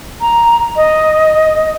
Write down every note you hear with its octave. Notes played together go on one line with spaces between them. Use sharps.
A#5
D#5